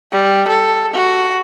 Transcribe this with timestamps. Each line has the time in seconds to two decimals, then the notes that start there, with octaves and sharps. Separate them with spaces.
0.12 G3
0.48 A4
0.93 F#4